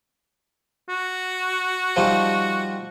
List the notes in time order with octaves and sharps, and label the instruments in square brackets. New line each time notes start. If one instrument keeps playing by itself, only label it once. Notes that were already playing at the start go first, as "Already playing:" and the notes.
[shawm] F#4
[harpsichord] F3 G3 D#4